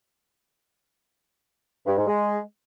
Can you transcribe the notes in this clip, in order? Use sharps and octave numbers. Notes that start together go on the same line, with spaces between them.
G2
G#2
G#3